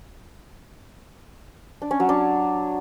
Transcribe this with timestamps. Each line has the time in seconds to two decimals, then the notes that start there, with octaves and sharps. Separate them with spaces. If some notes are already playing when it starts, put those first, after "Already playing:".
1.82 D4
1.91 C#4
2.00 F#3
2.09 D4